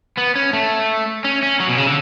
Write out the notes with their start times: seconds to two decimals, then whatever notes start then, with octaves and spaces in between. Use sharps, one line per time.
0.18 B3
0.36 C#4
0.53 A3
1.24 C#4
1.43 C#4
1.60 F#3
1.68 B2
1.77 C#3
1.86 D3